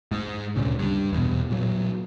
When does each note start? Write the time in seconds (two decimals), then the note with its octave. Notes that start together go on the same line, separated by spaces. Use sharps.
0.11 G#2
0.56 D2 A#2 C#3
0.79 G2
1.13 E2 B2
1.50 A#2 F#3